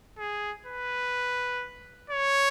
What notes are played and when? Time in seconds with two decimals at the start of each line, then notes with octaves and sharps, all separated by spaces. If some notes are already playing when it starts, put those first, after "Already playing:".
0.18 G#4
0.66 B4
2.10 C#5